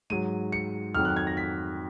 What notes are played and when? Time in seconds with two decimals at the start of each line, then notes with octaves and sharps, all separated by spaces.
0.10 G#2 F#3 D#7
0.52 C#7
0.95 F2 D#3 F#3 F6
1.05 F#6
1.17 G#6
1.27 A#6
1.37 B6